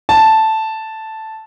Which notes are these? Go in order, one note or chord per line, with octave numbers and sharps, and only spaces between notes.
A5